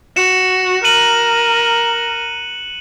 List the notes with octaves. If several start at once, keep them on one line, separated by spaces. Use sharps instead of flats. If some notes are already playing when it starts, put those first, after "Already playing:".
F#4 C#7 E7
A#4 F#6 D#7 F#7